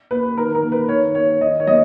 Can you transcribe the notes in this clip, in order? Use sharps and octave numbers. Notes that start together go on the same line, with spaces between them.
A#3 B4
D#3 A#4
A#4
A#3
B4
D#3 C#5
A#3 C#5
D#3 D#5
C#5
F#3 A#3 D#5